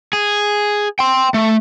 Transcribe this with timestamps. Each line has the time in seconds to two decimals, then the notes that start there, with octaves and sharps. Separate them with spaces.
0.13 G#4
0.99 G5 C6
1.34 A3